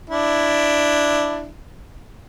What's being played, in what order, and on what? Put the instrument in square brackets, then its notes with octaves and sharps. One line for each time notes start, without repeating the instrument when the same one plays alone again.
[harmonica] D4 E4